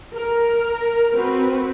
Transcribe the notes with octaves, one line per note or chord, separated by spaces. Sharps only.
A#4
C4 F#4 B4